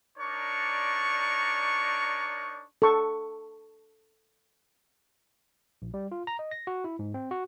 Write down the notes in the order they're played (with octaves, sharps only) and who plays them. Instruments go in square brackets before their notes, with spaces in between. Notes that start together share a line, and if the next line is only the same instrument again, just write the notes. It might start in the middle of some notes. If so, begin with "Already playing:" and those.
[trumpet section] D4 D#4 A#4 C#5 D5 C#6
[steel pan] A4 C#6
[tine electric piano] A#1
G3
F4
A#5
D#5
A#6
F#4
E4
G#2
C4
F#4